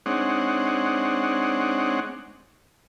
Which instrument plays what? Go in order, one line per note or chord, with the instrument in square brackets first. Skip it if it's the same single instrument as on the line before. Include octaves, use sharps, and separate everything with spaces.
[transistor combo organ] G#3 C4 D4 D#4 C#5 F#5